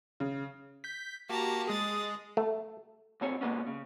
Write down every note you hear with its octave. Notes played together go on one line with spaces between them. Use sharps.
C#3
G6 B6
A#3 F#4 G4 A5 A#5
G#3 G#4 D#6 A6
A3
B1 F2 C4 C#5
A#2 G#3 A#3 B3 C#4
C#3